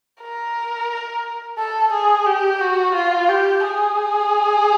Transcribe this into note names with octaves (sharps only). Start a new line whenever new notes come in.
A#4
A4
G#4
G4
F#4
F4
G4
G#4